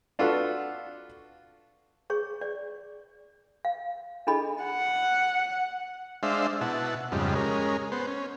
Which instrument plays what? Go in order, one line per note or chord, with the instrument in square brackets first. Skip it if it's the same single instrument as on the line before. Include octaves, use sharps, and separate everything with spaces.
[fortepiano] D4 F4 F#4 A4 B4
[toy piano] G#4 C#5 C#6
D5
F5
D4 E4 G#4 A4 D#5 B5
[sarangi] F#5
[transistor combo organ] G#3 D4 C5 E5 F5
B2 E4 F#5 A5
F2 G#2 C#3 G3
G#3 C#4 A#4
B3 C5
C#4